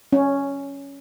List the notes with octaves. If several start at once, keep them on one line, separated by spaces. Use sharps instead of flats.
C#4